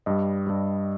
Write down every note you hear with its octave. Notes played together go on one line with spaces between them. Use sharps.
G2 G3 D#5
G2 G3